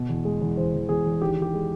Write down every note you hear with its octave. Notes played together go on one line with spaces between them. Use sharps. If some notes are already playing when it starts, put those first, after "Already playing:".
Already playing: B2
E2
G#3
E2
E2 C5
E2
E2 G#4
E2
D#3 G4
D#3
G4
G#3